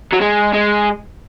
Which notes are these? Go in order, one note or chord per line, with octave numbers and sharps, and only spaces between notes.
F#3
G#3
G#3